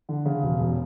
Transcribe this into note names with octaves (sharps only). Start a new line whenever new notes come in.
D3
C#3
E1
E1